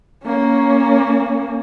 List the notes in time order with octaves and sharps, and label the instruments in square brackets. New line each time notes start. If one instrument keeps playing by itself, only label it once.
[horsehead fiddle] A#3 C#4